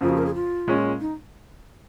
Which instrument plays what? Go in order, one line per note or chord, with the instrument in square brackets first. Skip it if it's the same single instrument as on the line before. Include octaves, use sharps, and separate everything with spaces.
[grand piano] F2 C#3 F3 A#3 [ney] F4
[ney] F#4
A#4
G#4
F4
[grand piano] A#2 G#3 C#4
[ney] D#4